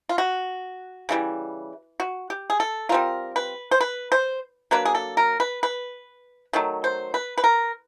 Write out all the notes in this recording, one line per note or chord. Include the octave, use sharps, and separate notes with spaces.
F4
F#4
C#3 E3 G3
F#4
G4
G#4
A4
G3 C4 F4 A#4
B4
C5
B4
C5
F#3 A#3 D4 B4
G#4
A4
A#4
B4
B4
D#3 F#3 A3
C5
B4
B4
A#4